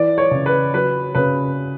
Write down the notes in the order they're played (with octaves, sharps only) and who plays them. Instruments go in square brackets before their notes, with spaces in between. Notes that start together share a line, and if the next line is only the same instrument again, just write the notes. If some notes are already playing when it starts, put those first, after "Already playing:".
Already playing: [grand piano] E3 D5
C#5
C#3
B4
F#3 B4
C#3 B4